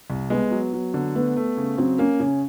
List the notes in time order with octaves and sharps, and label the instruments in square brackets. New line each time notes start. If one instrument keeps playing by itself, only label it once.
[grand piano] C2
[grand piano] G#3 [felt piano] B3
[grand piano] F#3
F#3
D3
[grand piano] A3 [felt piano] B3
[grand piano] A3
C#3
[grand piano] F#3 [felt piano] C4
[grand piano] A#3 [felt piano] C#4
[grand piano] C#3 [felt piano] C#4